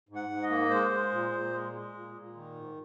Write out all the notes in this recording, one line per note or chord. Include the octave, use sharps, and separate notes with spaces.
G#2
F#5
G#2
D#5
A#3
G#3 C5
G#3
A#2
A#2
G#3
G#3
A#2
A#2
D#3
G#2